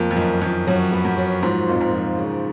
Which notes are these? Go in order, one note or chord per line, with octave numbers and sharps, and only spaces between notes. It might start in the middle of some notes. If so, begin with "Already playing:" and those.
Already playing: F2 A#3
F2
F#2 D#3
F2 D#3
F#2 F#3
B3
F#2
F#3
G#2 F3
F2 A#2
G#2
F3
C#3